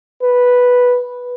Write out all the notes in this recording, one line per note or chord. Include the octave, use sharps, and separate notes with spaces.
B4